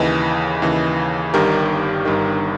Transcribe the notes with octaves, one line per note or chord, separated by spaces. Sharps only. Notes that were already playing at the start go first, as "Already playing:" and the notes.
Already playing: D#2 C#3 E3 B4 D#5
D#2 C#3 E3
G1 G2 D#3 G4 A#4
G1 G2 D#3